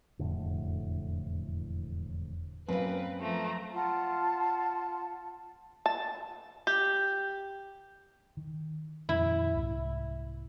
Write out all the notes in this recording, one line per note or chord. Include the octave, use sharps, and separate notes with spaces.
E1 F2 A2 D3
F#2 A#3 C4 B4
F3 A3 A#5
F4 F#5 A5
A5
G4
D#3
F2 A#2 D#3 E4
C2 G#2